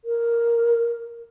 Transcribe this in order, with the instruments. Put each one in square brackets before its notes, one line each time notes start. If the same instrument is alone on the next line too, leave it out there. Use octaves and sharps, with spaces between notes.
[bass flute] A#4